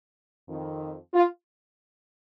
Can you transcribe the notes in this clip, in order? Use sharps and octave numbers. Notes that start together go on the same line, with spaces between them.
F2 D#3
F4